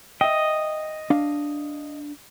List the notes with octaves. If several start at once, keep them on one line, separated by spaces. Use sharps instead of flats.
D#5 E5 G5
D4 F5